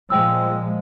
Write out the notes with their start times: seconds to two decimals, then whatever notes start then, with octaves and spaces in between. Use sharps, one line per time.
0.10 A#2 F3 G#3 G5 E6